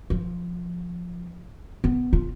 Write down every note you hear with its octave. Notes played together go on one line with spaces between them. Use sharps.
F3
B3
F4